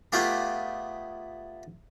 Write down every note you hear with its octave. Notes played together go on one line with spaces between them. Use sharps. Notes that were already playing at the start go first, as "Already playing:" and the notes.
A3 B3 F4 G4 G#4